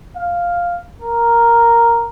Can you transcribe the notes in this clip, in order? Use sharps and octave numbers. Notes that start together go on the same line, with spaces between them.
F5
A#4